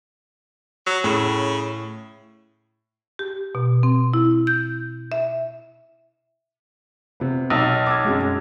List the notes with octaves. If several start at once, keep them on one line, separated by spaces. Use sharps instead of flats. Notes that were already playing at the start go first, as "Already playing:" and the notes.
F#3
A2 C#3
G4
B2
C4
E4
G6
E5
C3 B3
B1 D#5 D#6
D6 E6 G#6
F#2 F#3 G#3